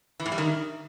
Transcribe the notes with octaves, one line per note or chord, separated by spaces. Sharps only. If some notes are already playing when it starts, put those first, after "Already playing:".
E3
A2
G3
D#3